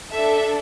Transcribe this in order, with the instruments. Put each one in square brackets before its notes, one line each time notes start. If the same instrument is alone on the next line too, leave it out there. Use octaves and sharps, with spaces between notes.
[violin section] D4 A4 E5